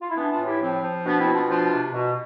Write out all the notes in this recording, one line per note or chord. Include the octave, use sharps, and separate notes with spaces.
F4
E4
E3 B3 D4
D4 F4
A2
E4 G4
F3 C4
F3
B2 B3 D4
C4 E4
B2
D4 F4
F3 D4 F4
C3
B2